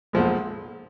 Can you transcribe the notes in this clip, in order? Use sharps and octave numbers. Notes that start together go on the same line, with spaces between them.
B1 A#2 F3 G#3